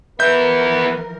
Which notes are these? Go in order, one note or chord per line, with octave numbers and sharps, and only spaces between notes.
E3 F3 B3 A#4 B4 E5 G6